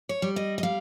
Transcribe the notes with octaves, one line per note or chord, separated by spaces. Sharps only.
C#5
G3
D#5
D#5
G3 F5